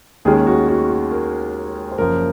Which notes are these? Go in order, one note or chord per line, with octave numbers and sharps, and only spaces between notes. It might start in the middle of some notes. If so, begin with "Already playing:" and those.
D#2 D#3 G#3 C#4 G#4
F#4
F#4
F#4
A#4
C5
F#1 F#2 F3 A#4